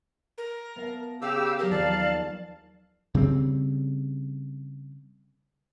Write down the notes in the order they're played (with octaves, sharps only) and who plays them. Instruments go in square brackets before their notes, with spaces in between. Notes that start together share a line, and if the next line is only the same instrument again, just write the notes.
[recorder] A#4
[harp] B3 F5 A5
[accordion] C#3 G4 E6 [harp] D5 F#5 [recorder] F5
[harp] F#3 G#4 [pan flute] G4 [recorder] A#4
[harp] D#2 F3 [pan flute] D5 [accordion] F5 [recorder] A5
[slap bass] C#3 G3 C4